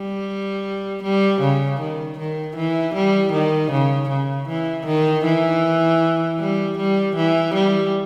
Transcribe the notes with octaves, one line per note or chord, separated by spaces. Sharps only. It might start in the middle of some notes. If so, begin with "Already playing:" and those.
Already playing: G3
G3
C#3
D#3
D#3
E3
G3
D#3
C#3
C#3
E3
D#3
E3
G3
G3
E3
G3